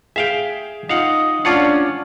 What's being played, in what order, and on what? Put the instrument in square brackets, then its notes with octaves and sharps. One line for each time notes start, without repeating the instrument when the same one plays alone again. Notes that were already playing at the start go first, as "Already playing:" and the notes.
[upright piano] G#4 [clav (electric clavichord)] E5 F5 G5
[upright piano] D#4 F4 [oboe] D#5 [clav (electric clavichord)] F5 F#5
[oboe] C#4 [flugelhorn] D4 [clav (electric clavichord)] F4 C#5 F#5 [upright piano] A5 C#6 D6